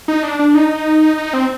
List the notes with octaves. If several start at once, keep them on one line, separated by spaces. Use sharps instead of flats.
D#4
D4
D4
D#4
D#4
C4